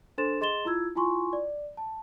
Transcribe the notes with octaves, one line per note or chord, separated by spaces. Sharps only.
D4 A4 C5 C6 A6 E7
G#4 D#5 C6 A6 E7 G7
E4 F4 E6 G#6
E4 F4 G#5 C6 C#6
D5
A5